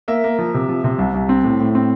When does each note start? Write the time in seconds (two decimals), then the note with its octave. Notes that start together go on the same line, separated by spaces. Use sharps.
0.08 A#3 E5
0.24 A#3
0.39 F3
0.54 C3
0.69 F3
0.84 C3
0.99 C2
1.14 C2
1.29 C4
1.44 A2
1.60 A2
1.75 C4